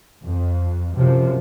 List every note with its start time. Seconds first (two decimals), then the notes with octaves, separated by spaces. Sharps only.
0.25 F2
0.95 F#2 C3 F3